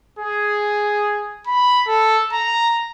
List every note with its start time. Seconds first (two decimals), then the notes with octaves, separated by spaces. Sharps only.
0.19 G#4
1.47 B5
1.88 A4
2.33 A#5